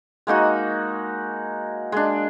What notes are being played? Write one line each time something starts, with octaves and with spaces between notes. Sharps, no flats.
G#3 A#3 D#4 F#4
G#3 D4